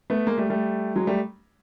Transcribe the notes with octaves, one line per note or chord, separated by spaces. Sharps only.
A3 B3
G#3 A#3
G3 A3
G3 A3
F#3 G#3
G3 A3